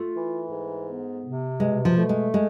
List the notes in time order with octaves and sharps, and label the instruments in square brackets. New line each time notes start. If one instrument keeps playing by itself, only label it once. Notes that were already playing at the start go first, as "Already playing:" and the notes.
Already playing: [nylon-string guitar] A3 [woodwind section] F4
[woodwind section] E3
G#2
B3
C3
[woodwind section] B2 [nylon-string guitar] G#3
[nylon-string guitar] F3
[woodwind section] A3
[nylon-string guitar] G#3
G#3